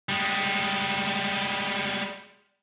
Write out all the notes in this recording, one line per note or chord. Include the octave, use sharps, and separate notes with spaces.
G3 G#3